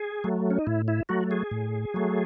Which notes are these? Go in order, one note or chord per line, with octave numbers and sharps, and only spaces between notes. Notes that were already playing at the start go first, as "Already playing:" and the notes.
Already playing: G#4
F#3 A3
C#4
D#4
A2 E4
E4
F#3 A3 F#4
G#4
A2
F#3 A3